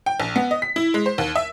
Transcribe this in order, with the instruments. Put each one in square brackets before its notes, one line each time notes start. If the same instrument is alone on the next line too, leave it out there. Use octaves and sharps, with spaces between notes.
[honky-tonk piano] G5
A#1
B3
D#5
B6
E4
G#3
C5
D#2
E5